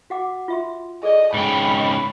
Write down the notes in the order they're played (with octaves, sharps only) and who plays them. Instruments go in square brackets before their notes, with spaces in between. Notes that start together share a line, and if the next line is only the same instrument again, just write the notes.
[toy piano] F#4 F#5 D6
F4 E5 C6
[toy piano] G#4 A4 D5 [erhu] D#5
[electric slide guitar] G#2 C#3 G5 [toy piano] D#5 [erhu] B5
[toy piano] D#5 G#5 C#6